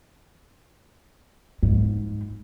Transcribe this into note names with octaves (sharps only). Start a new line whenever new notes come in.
G#2